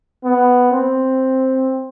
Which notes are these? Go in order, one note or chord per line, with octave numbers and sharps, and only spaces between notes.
B3
C4